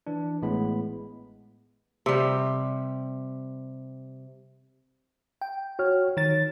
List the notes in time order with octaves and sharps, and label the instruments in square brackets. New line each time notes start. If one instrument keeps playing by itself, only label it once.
[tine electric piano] E3 D4
A1 A2 G#3 B3 B5
[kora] C3 G3
[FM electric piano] G5
[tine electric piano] F#4 C#5 F6
[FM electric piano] D#3 A6 [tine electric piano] C#5